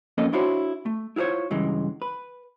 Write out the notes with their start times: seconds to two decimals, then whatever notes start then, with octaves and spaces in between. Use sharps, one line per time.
0.18 F2 A#3 C#4 A4 B4 D#5
0.33 D4 E4 F#4 C5 C#5
0.86 A3
1.16 E4 F4 A4 C5 C#5
1.51 G2 C#3 E3 G#3
2.02 B4